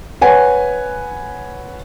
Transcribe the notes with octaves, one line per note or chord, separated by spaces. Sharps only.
B4 C#5 F#5 G#5